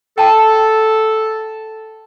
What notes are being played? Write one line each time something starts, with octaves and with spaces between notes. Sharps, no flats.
A4 G5 A5